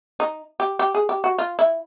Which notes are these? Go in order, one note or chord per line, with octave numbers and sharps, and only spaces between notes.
D#4
G4
G4
G#4
G4
F#4
F4
E4